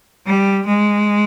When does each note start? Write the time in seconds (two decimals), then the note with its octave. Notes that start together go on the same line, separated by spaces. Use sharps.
0.26 G3
0.67 G#3